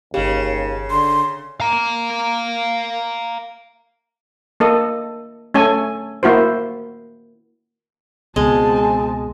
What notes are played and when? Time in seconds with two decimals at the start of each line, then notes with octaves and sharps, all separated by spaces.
0.14 G1 D#2 C#3 G4
0.91 D3 C6
1.60 F5 A#5
4.60 A#3 A4 D#5
5.54 A3 C#4 A4 G#5
6.23 A#3 E4 F#4 C5
8.36 C#2 B2 G#3 C4 G#5 A5